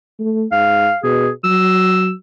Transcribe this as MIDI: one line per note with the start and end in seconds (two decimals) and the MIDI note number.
0.20 0.44 57
0.52 0.88 44
0.52 0.98 77
1.04 1.29 47
1.04 1.30 68
1.44 2.11 54
1.44 2.12 88